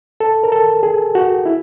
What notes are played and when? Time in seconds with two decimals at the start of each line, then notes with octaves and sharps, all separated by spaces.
0.20 A4
0.43 A#4
0.52 A4
0.83 G#4
1.15 F#4
1.46 E4